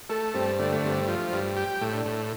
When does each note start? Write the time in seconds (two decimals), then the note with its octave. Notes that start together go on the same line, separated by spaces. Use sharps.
0.09 A3 A4
0.34 G2 C4
0.59 D3 A3
0.72 A3
0.83 G2 C4
1.08 F3
1.32 G2
1.57 G4
1.81 A2
1.93 D4
2.05 A2